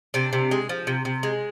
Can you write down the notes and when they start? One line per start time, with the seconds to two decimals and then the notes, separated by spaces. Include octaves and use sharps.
0.14 C3 D4
0.33 C3
0.51 G#3
0.69 F3
0.87 C3
1.05 C3
1.23 G#3